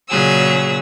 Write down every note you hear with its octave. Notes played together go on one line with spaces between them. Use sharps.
A#2 C#3 F#3 G#4 E6